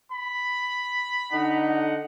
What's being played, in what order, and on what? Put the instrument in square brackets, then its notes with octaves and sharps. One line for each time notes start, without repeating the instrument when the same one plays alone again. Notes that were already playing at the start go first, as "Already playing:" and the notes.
[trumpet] B5
[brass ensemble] D3 D#4 F#5